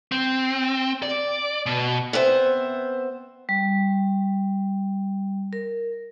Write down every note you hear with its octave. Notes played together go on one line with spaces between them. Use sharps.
C4
D5
B2
B3 C4 C5 E5
G3
A#4